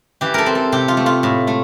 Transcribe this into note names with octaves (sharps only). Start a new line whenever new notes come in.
E3 G4
A4 A#4
C4
A4
C3 G4
F4
A3
F4
A2
A3